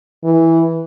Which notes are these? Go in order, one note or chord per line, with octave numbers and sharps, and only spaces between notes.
E3